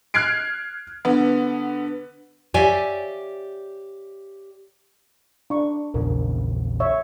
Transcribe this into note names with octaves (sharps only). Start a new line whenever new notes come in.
F6 F#6 G#6 C7 D7
D3 B3
G4 C#5 D5 E5 F5 G#5
D4 C#6
A#1 E2 C#3 A#4
C#5 E5